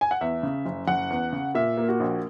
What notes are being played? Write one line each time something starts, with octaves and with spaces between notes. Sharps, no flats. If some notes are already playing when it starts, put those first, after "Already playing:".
G#5
F#5
E2 E5
C#3
F#1
F#1 F#5
E2
C#3
A#2 E5
A#3
F#4
A#1